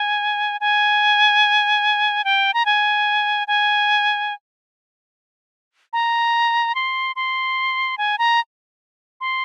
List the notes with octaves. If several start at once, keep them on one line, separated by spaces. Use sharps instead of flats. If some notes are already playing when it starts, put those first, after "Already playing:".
Already playing: G#5
G#5
G5
A#5
G#5
G#5
A#5
C6
C6
G#5
A#5
C6